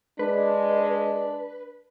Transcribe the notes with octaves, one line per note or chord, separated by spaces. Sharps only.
G#3 D4 B4